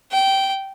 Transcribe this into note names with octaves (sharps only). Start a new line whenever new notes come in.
G5